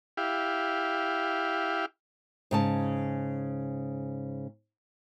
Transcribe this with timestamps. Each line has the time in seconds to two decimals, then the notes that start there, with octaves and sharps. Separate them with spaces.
0.17 E4 G4 F5
2.51 G#2 C#3 A5